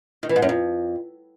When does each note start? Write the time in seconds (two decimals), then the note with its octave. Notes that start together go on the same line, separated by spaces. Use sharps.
0.23 D#3
0.29 E3
0.36 G#2
0.42 F#2
0.49 F2